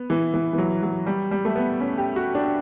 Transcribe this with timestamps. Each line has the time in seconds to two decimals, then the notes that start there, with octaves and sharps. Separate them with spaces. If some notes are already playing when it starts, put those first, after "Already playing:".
Already playing: B3
0.10 E3
0.34 E3
0.53 E3
0.58 F#3
0.83 F#3
1.06 G3
1.31 G3
1.45 A3
1.56 B3
1.81 C#4
1.98 G4
2.16 F#4
2.35 D4